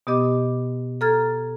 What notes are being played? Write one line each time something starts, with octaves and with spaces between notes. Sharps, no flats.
B2 B3 G4 D#5 D6
A4 A#5 F6 G#6 A6